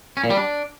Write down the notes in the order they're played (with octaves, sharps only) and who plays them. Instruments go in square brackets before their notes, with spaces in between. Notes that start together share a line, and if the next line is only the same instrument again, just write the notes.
[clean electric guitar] C#4
A#2
G3
D4